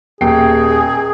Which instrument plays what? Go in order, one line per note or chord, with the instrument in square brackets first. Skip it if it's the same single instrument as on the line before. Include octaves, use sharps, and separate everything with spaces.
[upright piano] D#1 G5 C7 [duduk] G#4